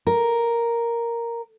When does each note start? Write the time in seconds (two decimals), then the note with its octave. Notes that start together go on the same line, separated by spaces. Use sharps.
0.07 A#4